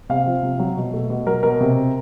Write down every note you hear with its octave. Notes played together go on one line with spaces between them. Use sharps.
C3 F5
F3
C3
F#3
B2
A3
B2
F#3 A#4
B2 A#4
C3